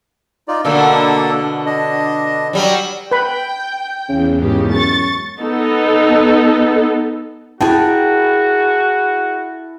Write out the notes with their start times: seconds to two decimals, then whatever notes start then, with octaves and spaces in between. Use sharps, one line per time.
0.48 D#4 F4 D5
0.65 B2 D3 A3 A#3 D4 A4
1.66 D4 D#5
2.53 F#3 G3
3.11 B4 G5 B5
4.09 E2 C#3
4.41 C#2 G#2 C#3 G4
4.72 F#2 C#6 A6
5.40 B3 D#4 A4
7.61 E4 F#4 G#4 A#4 G5 A5